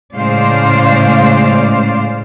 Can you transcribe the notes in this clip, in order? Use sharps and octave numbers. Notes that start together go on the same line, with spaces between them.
A2 C#3 G#3 C5 D5 F5